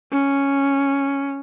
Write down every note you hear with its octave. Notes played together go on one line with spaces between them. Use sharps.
C#4